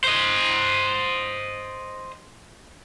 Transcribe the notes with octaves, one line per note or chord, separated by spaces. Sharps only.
C5 D#5